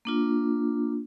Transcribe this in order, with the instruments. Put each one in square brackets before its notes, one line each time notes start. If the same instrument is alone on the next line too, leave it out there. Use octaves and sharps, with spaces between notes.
[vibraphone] A#3 D4 F4